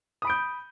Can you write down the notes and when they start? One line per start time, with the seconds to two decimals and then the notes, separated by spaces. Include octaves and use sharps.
0.22 D#6
0.25 B5
0.27 D7
0.30 G6